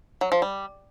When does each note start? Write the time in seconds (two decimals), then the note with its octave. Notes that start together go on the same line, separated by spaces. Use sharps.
0.21 F#3
0.32 F3
0.42 G3